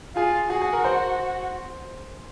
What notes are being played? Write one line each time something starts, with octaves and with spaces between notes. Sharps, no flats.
F4 G#4
F#4 G#4
G#4
A#4
C5